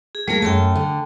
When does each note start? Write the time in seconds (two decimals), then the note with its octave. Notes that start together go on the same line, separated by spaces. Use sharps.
0.15 G#4
0.28 G3 A3 A#3 G#4 A#4
0.42 F#2 A3 G5 A5
0.76 D3